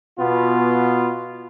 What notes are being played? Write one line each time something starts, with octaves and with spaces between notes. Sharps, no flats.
B2 B3 F4